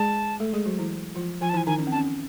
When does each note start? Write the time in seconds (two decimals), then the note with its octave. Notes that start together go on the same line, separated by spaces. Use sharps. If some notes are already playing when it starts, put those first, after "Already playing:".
Already playing: G#3 G#4 A5
0.40 A3 A4
0.53 G#3 G#4
0.66 F#3 F#4
0.79 E3 E4
1.16 F3 F4
1.41 F3 F4 G#5
1.49 A5
1.54 E3 E4 G#5
1.67 D#3 D#4 G#5
1.79 C#4
1.87 C4
1.92 A5
1.95 C#4